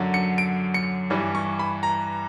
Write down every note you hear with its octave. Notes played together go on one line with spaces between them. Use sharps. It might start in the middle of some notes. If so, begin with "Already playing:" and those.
Already playing: F#2 D3 F#3
C#7
D7
C#7
G2 E3 G3
C#6
B5
A#5